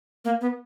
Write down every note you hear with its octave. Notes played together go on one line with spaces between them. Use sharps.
A#3
B3